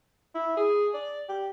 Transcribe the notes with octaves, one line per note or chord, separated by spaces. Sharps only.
E4
G#4
D5
G4